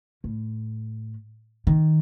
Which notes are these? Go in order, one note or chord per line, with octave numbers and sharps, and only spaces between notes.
A2
D#3